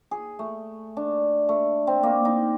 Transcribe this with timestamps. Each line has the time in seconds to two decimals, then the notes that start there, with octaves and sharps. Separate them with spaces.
0.11 G#4
0.39 A3
0.97 D4
1.49 A3
1.87 C4
2.03 A#3
2.25 D#4